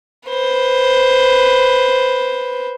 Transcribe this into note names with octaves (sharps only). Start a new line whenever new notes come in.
B4 C5